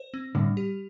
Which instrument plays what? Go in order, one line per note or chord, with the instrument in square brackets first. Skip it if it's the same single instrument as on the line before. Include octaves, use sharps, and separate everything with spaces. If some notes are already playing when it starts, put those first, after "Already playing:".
Already playing: [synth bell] C5
C4
[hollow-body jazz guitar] A2 D3 [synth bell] G3
[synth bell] G4